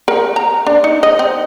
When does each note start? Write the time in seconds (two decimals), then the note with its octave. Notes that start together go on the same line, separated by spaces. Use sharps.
0.08 A#4
0.36 A#5
0.66 D4
0.84 D#4
1.03 D#5
1.19 C4